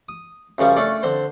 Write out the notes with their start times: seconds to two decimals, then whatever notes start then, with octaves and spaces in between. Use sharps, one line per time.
0.09 D#6
0.58 F#2 C#3 F3 G3
0.76 A3 C#4 D4 A4 D5
1.03 D3 C4 C5